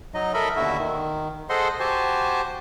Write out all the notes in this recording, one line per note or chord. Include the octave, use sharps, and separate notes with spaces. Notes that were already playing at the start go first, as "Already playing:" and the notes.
F#3 D#4 D#5
A4 A#4 D#5 E5 B5
D#2 B2 D3 E4 F#4 E5
D#3
G#4 A4 C5 D#5 F#5 C6
F#4 G4 C5 G#5 A5